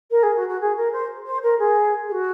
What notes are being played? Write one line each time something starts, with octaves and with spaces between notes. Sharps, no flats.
A#4
G#4
F#4
F#4
G#4
A#4
C5
C5
A#4
G#4
G#4
F#4